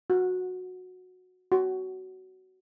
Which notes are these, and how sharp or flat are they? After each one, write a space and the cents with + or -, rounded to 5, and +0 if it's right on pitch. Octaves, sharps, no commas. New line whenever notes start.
F#4 -15
F#4 +15